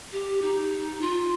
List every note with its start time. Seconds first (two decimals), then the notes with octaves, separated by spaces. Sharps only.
0.12 G4
0.42 D#4
1.02 F4